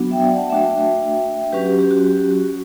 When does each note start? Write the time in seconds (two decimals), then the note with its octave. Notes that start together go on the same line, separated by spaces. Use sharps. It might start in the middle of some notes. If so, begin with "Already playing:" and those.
Already playing: F#3 B3 D4 F#4
0.11 E5 G5
0.24 D5 F#5
0.36 F#5 A5
0.50 A3 D4 F#4 E5 G5
1.52 F#3 C#4 F#4 G4 B4
1.66 G4
1.79 G4
1.91 F#4
2.04 G4
2.30 F#4